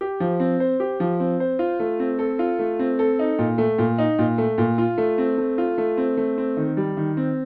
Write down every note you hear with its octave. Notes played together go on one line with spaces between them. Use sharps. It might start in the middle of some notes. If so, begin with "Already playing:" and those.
G4
F3
C4
C5
G4
F3
C4
C5
F4
A3
C4
A4
F4
A3
C4
A4
D#4
A#2
A3
A#2
D#4
A#2
A3
A#2
F4
A3
C4
A3
F4
A3
C4
A3
C4
D#3
G3
D#3
C4